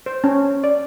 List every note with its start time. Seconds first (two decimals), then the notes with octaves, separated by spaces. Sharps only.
0.06 C5
0.24 C#4
0.64 D5